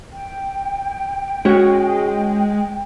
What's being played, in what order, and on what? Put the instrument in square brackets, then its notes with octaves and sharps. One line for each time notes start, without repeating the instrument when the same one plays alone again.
[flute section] G5
[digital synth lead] G#3 [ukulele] C#4 F#4 C#5